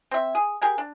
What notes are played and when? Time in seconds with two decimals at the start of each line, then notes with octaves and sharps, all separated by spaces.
0.11 C4 E5
0.35 G#4
0.62 G4 G#4 A#4 G#5
0.78 D4